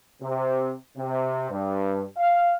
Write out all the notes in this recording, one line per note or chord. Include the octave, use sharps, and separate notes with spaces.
C3
C3
G2
F5